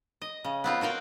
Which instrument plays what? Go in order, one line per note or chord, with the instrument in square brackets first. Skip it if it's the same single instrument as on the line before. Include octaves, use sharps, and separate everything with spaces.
[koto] D#5
C#3
B3 C4 F4
F#4 A#4 F5 G5